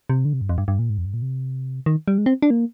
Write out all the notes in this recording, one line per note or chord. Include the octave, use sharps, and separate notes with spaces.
C3
D3
C3
G2
F2
G2
G2
A#2
G#2
F2
G2
A#2
C3
D#3
G3
G#3
C4
D4
A#3